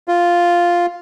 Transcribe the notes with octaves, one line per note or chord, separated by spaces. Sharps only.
F4